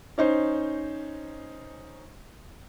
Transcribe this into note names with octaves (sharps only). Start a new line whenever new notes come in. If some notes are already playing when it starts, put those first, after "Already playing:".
C#4 D#4 C5